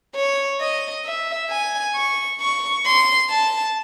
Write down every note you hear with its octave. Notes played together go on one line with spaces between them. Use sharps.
C#5
D#5
E5
G#5
C#6
C#6
C6
A5